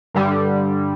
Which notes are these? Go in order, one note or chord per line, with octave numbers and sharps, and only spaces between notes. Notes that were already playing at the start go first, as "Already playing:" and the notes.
G2 D3 G3